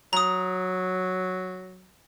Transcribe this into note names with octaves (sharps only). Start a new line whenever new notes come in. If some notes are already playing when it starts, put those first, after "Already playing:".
F#3 A#5 D#6